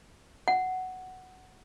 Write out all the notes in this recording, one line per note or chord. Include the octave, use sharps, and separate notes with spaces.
F#5